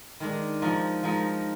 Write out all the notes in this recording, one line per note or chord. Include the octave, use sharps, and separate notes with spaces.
D#3 G#3 D4
F3 G#3 D#4 A#4
F3 G#3 D#4 A#4